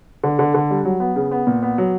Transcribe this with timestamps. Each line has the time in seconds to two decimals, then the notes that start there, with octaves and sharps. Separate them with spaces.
0.24 D3
0.39 D3
0.54 D3
0.71 G3
0.85 F#3
1.00 B3
1.16 C#3
1.31 B3
1.47 A#2
1.63 B3
1.78 F#3